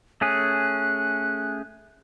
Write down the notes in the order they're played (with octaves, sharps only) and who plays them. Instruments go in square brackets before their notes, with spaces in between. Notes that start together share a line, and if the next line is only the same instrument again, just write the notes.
[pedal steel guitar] A3 C#4 G#4 [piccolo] F#6